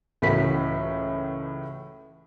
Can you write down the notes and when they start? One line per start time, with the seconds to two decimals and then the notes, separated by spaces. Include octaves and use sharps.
0.22 C#2 A2 E3 F#4 A#4 B6